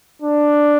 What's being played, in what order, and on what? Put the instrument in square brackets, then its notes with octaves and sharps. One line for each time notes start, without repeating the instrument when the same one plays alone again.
[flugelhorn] D4